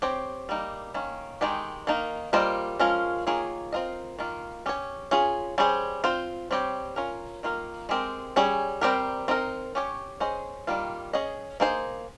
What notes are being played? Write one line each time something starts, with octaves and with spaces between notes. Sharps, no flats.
C4 G4 C#5
G3 A#3 D#4
D#3 A#3 C#4
D#3 G#3 D#4 G4
D#3 A#3 D#4
G3 A#3 F4 C5 D#5
F3 G#3 C#4 F4 A#4
D#3 A#3 F4 G#4 C#5
C4 F4 A#4 D#5
D#3 A#3 F4
C#4 G4 C#5
C#4 F4 G#4
G3 C#4 G#4 C5
C4 F4 C5
G3 C4 G4 C#5
C#4 F4 A#4
D#3 A#3 F4 A#4
G#3 C4 G4 A#4
G3 C#4 G#4 C#5
G3 C4 D#4 G4 A#4
C4 D#4 A#4
C#4 G4 C#5
C#4 G#4 C5 D#5
D#3 G3 A#3 F4
C#4 G#4 D#5
A#3 D#4 G#4 C5